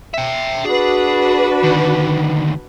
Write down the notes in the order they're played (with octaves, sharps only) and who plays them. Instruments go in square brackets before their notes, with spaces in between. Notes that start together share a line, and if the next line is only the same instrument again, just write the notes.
[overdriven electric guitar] E5 G5
[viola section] D4 F#4 B4 [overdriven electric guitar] G#4
[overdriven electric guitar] D2 D#3